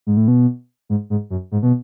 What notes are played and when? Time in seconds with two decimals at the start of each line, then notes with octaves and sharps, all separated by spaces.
0.06 G#2
0.17 A2
0.28 B2
0.89 G#2
1.10 G#2
1.30 F#2
1.52 G#2
1.63 B2